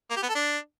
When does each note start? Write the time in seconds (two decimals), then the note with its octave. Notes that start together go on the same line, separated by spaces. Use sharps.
0.11 A#3
0.17 G4
0.23 B3
0.29 A4
0.35 D4